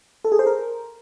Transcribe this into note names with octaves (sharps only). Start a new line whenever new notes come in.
A4
G#4
C5
A#4